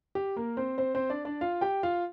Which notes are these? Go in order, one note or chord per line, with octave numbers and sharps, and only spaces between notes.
G4
A#3 A#4
C4 C5
C4 C5
C4 C5
D4 D5
D4 D5
F4 F5
G4 G5
F4 F5